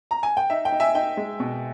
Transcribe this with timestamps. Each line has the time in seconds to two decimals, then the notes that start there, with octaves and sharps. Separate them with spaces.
0.11 A#5
0.23 G#5
0.37 G5
0.50 D#4 E5
0.65 G5
0.72 D#4
0.80 E5 G#5
0.95 D#4 G5
1.17 G#3
1.40 B2